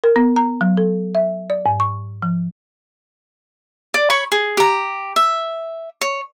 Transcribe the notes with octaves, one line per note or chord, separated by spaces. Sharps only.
A#4
B3
A#5
F#3
A4
E5
D5
G#2
C#6
F3
D5
C#5 B5 C#6
G#4
G4 A#5
E5
C#5